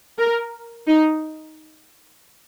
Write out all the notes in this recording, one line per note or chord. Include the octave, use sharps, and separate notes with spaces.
A#4
D#4